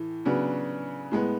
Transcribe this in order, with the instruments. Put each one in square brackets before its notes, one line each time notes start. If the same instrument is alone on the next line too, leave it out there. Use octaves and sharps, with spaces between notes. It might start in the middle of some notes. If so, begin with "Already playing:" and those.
Already playing: [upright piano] A2 E3
C#3 F#3 B3 D4
A2 G#3 B3